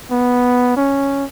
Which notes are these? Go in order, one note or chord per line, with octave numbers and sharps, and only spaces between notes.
B3
C#4